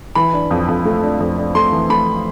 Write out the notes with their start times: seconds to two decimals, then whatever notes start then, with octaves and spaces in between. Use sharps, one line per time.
0.15 E3 B5
0.33 D4
0.51 F2
0.68 F2
0.85 A3
1.03 D4
1.20 F2
1.38 D4
1.55 A3 C6
1.72 E3
1.90 A3 B5